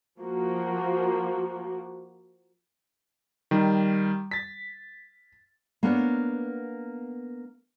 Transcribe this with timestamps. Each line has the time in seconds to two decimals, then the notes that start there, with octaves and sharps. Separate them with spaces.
0.19 F3 A#3 F#4
3.51 D#3 G3
4.31 A6 B6
5.83 A#3 B3 D4 C#5